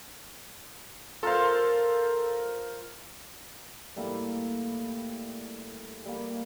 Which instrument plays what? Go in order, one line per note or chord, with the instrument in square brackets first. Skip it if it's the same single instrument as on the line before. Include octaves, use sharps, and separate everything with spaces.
[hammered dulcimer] F4 A#4 C5 [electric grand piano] A4 F5
[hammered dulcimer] A2 G3 A#3 E4
G3 A#3